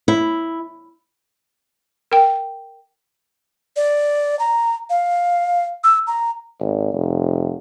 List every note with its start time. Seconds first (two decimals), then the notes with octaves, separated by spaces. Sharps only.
0.08 E4
2.12 A#4 G5
3.76 D5
4.39 A#5
4.90 F5
5.84 E6
6.07 A#5
6.60 G#1
6.93 F1